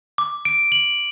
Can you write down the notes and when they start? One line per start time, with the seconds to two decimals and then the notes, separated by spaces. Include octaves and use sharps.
0.18 D6
0.45 D7
0.72 F#7